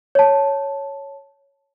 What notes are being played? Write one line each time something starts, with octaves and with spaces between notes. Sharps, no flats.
C#5 A5